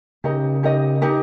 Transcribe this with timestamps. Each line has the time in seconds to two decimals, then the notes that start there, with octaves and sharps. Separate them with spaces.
0.24 C#3 D#4 G4 A#4 D#5
0.63 D#4 G4 A#4 D#5
1.01 D#4 G4 A#4 D#5